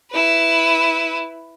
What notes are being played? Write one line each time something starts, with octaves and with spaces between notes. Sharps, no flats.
E4 B4